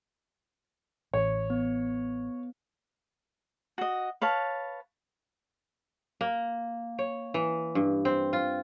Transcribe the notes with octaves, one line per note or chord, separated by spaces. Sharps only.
A1 C#5
B3
F#4 D#5
B4 C#5 F5 A5
A#3
C#5
E3
G2
C4
F4